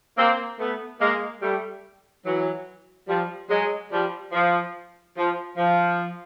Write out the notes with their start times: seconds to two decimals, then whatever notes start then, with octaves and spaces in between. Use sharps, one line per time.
0.17 A#3 C4
0.59 A3 B3
1.00 G#3 A#3
1.42 G3 A3
2.25 E3 F#3
3.08 F3 G3
3.50 F#3 G#3
3.91 F3 G3
4.32 F3
5.16 F3
5.57 F3